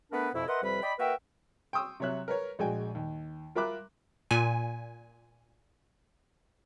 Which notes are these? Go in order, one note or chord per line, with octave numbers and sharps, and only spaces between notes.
A3 B3 D4 A#4 B4
F2 B2 E4
A#4 B4 D#5 E5 F#5 C6
F2 C3 G3 B4 B5
D5 D#5 G5 B5
A#3 F#4 A#4 B4 E5 G5
G5 C6 C#6 D#6 E6
C3 F#3 C#5 E5 F#6
A#4 B4 C#5
A#1 G#3 F#4 G5 G#5
D#2
F4 A#4 E5 B5 D6 F#6
A#2 G#5